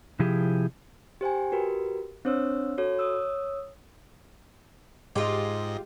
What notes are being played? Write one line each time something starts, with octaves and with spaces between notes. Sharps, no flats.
C3 F3 E4 G4 G#4
G4 C5 G5 G#5
F#4 G4 A#4 B4
C4 D4 C5 C#5 E6
F#4 A4 C#5
C#5 D#6 E6
G#2 G#3 F4 G4 D#5